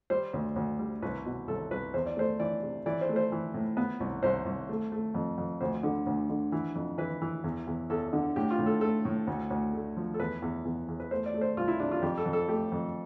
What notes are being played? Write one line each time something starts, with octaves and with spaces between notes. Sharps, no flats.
G3 C5
D2
D2
G3
C2 B4
B2
C2 A4
C2 B4
E2 C5
D5
A3 C5
E3 D5
C3
E3 D5
C5
A3
C5
E3
A2
B3
C2
C2 C5
C2
A3
A3
F2
F2
D2 C5
D3
D2
D3
E3
F2
E3 B4
E3
E2
E2
E2 A4
D3
A2 G4
F4
A2
A4
A3 A4
A2
D2
D2
A3
F3
A4
E2 B4
E2
E2
E2
B4
A3 C5
D5
A3
C5
C2 F4
E4
C3 D4
F4
F2 G4
A4
F2
A4
A3 G4
F2